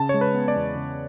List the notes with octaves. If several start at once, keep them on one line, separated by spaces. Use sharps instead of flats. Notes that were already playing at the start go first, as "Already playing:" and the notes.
Already playing: C#3 A5
G#3 C#5
B4
B3
D5
E2
C#3